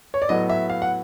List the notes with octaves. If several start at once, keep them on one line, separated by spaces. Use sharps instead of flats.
C#5
D5
A2 F#3 B3 D#5
E5
F5
F#5